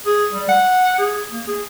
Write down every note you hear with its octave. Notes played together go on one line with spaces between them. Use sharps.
G#4
G3
F#5
G#4
A#3
G#4